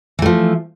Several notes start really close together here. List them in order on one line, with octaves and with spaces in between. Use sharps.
E3 A3 F3